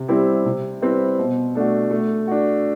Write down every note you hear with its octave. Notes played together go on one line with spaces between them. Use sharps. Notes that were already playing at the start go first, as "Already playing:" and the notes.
Already playing: C3
G3 C4 E4 G4
C3
G3 C4 E4 B4
B2
A3 D4 F#4
A3
D4 F#4